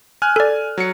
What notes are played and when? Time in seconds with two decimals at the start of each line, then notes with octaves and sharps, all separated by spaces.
0.22 G#5 F6 F#6
0.36 A4 D5
0.78 F#3 C#7